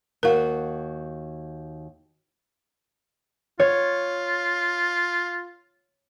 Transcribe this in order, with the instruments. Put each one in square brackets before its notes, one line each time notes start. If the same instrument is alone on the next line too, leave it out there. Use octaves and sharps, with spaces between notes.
[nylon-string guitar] D#2 F#4 [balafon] A#4 F5
[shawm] F4 [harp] C#5